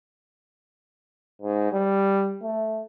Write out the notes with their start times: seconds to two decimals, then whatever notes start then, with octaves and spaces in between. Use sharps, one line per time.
1.42 G#2
1.72 G3
2.43 A3